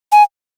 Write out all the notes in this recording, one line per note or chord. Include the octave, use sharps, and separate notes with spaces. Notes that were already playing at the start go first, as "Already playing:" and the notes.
G#5